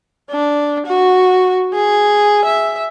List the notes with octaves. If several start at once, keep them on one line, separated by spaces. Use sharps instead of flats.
D4
F#4
G#4
E5